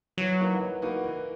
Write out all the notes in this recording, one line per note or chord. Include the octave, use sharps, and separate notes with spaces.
E3 F#3
A#3 D#4 F#4 B4
E3
A#3 D#4 F#4 B4
E3